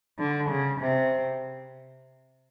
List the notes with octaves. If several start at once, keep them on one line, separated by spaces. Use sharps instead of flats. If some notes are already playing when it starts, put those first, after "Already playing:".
D3
C#3
C3